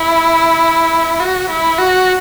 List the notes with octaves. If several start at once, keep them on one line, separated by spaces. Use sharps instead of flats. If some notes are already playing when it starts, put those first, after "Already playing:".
Already playing: E4
F#4
E4
F#4